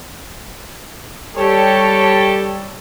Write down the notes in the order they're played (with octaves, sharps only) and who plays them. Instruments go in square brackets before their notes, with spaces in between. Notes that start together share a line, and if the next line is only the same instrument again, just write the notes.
[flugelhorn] G3 [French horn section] G4 A4 [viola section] C#5 A5